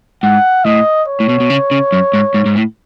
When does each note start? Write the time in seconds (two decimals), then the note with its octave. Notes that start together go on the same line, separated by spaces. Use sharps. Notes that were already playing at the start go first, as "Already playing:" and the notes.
0.23 G#2 F#5
0.65 A2 D#5
1.08 C#5
1.20 A2
1.29 B2
1.40 B2
1.50 C#3
1.71 C#3
1.92 F#2
2.13 G#2
2.34 G#2
2.46 G#2
2.55 A2